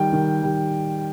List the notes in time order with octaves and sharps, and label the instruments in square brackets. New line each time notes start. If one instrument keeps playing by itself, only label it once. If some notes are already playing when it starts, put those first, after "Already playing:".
Already playing: [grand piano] D#3 G3 [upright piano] G5
[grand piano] D#3
G3